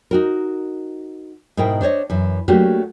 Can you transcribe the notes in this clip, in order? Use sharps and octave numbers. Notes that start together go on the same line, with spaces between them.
D#4 F#4 A#4
G#2 B2 E4 A#4 G5
D4 C5 C#5 D#5
F#2 E3
F#3 A3 A#3 D4 F#4 G4